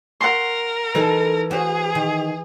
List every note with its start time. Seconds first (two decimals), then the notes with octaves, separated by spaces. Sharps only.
0.21 A#4 F#5 C6
0.95 E3 D#4 A4
1.51 F#4 G#4 C5
1.95 D#3